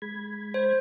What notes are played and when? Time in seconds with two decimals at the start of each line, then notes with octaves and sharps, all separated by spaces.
0.02 G#3 B5 G#6
0.54 C5